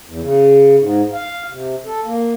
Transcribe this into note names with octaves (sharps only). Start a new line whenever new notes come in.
E2
C#3
G#2
F5
C3
A4
A#3